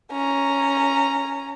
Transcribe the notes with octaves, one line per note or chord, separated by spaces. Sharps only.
C#4 A#5